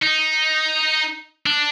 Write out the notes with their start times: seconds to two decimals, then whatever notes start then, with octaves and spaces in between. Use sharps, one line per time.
0.03 D#4
1.46 D4